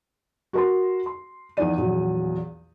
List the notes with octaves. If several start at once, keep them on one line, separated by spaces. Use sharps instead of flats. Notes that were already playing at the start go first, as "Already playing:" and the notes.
F#4 A#4 C6
C6
E2 E3 F3 D#4 D5 D#7
A#1 E2 A#2 F#3